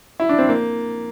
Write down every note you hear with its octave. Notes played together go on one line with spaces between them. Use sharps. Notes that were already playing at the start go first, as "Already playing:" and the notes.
E4
D4
C4
A#3